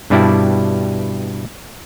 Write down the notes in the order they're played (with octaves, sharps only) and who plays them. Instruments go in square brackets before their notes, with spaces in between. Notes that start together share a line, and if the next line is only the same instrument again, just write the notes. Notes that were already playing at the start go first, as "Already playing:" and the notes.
[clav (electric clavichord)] G2 B2 G3 E4 D5 A5